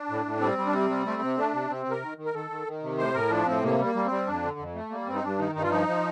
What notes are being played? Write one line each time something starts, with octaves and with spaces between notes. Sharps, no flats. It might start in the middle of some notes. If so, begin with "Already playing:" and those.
Already playing: D4
A2
A2
G3 C4
G3
D4
C3 C4
G3
A3 C4
C3
A3 D4
C3
C3 C4
C3 A#4
D#3
D#3
A#4
D#3 A4
D#3
D#3
C3
A2 C5
A2 A#4
F3 D4
A2 C4
C3 A#3
G3
A#3
G3
G3 C4
F2 D4
D3
F2
A3
G3 A#3
G2 C4
D#4
G2 D4
D#3 D#4
G2 D#4
F4
F3 D#4
F3